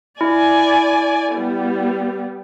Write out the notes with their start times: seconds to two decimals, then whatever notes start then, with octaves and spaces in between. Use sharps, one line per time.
0.21 E4 D5 G#5
1.33 G3 B3